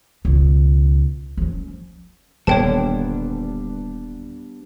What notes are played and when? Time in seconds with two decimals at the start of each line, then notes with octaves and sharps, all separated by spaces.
0.25 C#2 B2
1.37 F3 C#4
2.47 D#1 D3 G3 B3 D4 C#5 G5 A5